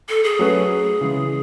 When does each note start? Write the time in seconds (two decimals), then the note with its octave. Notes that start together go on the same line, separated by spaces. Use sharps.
0.09 A4
0.24 G#4
0.39 F#3 A3 C#4 F#4 B4
1.01 C#3 E3 G#3